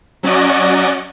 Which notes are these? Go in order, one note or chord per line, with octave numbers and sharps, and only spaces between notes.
F#3 C#4 F#4 D5 D#5